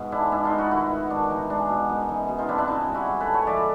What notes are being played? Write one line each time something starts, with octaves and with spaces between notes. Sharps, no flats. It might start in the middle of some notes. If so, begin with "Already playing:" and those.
Already playing: G#2 B2
G#3 D4 E4
G#2 D4 E4
D#4 F4
B3
E4 F#4
D#3 E4 F#4
D#3
G#2 D4
E3 D#4
G#3 D4
B2
F#2 D#4
E3 D#4
B2
D#4 F4
C4 D4 E4
D4 E4
C#3 D#4
G3
E4 F#4
G#3
A4 B4
D3
B4 C#5
F3 D5 E5